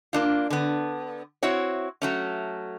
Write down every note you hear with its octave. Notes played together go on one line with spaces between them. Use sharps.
A#3 D4 F4
D3 B3
C4 E4 F#4 C#5
F#3 A3 C#4